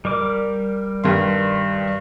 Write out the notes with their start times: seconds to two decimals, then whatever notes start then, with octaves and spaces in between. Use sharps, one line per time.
0.05 G3 A#4 D6
1.04 G2 D#3 C6